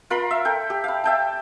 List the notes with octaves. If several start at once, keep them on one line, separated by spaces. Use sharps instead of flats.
F4 A#4 B5 C6
E5
A4 G5
G4
F5 B5
E5 G5 A5